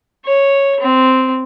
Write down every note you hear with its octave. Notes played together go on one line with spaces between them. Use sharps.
C#5
C4